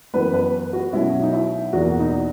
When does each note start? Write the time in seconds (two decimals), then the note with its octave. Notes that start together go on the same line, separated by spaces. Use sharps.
0.14 F#2 E3 B3 B4
0.34 B4
0.73 F#4
0.93 B2 F#3 C#4 E4
1.22 D#4
1.33 E4
1.73 E2 B2 A#3 F#4
1.99 D#4